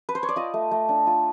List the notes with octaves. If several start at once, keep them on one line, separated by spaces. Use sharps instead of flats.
B4
C5
C#5
D5
F4 D#5
A3
A3
D4
F4